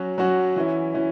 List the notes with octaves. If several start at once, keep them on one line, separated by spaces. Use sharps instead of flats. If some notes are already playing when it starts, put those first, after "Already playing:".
Already playing: F#3 C#4 F#4
F#3 C#4 F#4
E3 C#4 E4
E3 C#4 E4